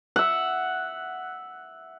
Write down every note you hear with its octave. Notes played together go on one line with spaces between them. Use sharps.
E5 F#5